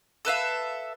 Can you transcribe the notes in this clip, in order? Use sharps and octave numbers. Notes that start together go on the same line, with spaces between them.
A4 B4 E5 F5